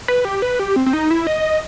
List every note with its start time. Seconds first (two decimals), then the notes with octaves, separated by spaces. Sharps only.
0.08 B4
0.25 G4
0.42 B4
0.59 G4
0.76 C4
0.86 C4
0.93 D#4
1.11 E4
1.27 D#5